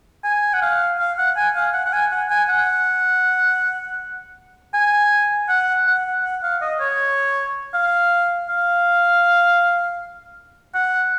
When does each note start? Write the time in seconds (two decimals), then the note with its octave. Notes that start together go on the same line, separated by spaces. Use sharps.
0.24 G#5
0.53 F#5
0.62 F5
0.99 F5
1.18 F#5
1.36 G#5
1.55 F5
1.73 F#5
1.85 F#5
1.93 G#5
2.11 F#5
2.30 G#5
2.49 F#5
4.74 G#5
5.49 F#5
5.87 F#5
6.24 F#5
6.43 F5
6.61 D#5
6.80 C#5
7.74 F5
8.49 F5
10.74 F#5